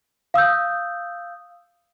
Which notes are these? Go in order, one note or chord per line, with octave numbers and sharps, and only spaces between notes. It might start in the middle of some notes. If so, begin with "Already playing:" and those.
F5 D#6 E6 G6